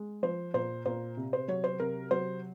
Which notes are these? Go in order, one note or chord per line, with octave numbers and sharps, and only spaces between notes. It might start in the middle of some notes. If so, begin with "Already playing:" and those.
Already playing: G#3
F3 C5
A#2 C5
A#2 C5
C3
C5
F#3 C#5
C5
C3 A#4
F#3 C5